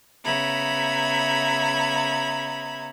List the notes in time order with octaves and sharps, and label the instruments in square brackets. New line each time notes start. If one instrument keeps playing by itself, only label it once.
[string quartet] C#3 B3 E5 A#5 B5 G#6